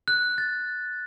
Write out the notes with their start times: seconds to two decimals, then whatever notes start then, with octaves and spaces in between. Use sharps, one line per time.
0.08 F#6
0.38 A6